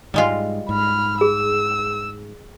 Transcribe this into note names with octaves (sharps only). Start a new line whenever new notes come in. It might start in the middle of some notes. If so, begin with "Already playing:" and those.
G#2 G3 G#3 F4
G#2 B5 F6
G#4 E6